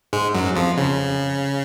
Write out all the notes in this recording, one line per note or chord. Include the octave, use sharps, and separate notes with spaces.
G#2 G#3
F#2 F#3
F2 F3
C#3